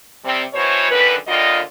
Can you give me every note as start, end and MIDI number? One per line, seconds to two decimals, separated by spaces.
0.24 0.42 48
0.24 0.42 55
0.24 0.42 60
0.53 0.87 47
0.53 0.87 52
0.53 0.87 54
0.53 0.87 72
0.53 0.87 73
0.90 1.13 42
0.90 1.13 50
0.90 1.13 51
0.90 1.13 71
1.28 1.59 39
1.28 1.59 50
1.28 1.59 51
1.28 1.59 55
1.28 1.59 65
1.28 1.59 75